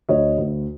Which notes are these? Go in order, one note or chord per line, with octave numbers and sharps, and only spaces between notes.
D2 C#5 D#5
D2